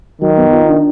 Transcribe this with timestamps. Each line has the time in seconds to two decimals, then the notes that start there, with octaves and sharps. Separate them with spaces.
0.21 D#3 F#3
0.38 B3
0.53 F4
0.69 D4